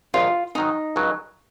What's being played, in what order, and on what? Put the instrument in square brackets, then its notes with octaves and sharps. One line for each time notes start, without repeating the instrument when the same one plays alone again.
[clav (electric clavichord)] A#1 G#2 D#3 [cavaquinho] F4
[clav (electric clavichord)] G#2 D#3 F#3 [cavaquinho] D#4
[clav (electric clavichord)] C#2 C#3 F#3